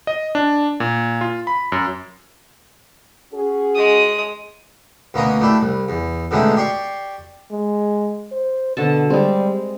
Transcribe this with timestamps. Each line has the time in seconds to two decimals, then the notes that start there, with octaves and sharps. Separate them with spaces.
0.07 D#5
0.35 D4
0.80 A#2
1.21 F4
1.47 B5
1.72 F#2
3.33 C#4 F#4 G#4
3.75 G#3 D#6
5.14 D2 B2 A#3 C#4 A#4 D#5
5.41 A3 D4 E4 G4
5.61 C2
5.89 E2
6.31 B2 D3 D#3 G#3 A3 C#4
6.56 G4 D5 C6 C#6
7.51 G#3
8.32 C5
8.77 B2 D3 A4 A5
9.10 G3 G#3 C4